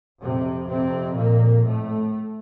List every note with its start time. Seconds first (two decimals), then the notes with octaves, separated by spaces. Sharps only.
0.21 F2 C3
0.68 C3 C4
1.16 A#2 A#3
1.65 A2 A3